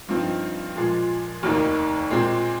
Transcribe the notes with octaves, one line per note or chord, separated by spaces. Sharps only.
G2 F3 C4 D#4
A#2 F3 G#3
F1 D#2 D#3 A#3 D#4
A#2 G#3 C4